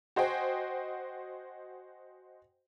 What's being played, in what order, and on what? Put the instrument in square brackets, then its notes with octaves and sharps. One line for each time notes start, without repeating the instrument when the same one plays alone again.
[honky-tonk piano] F#4 C5 D#5 G5 G#5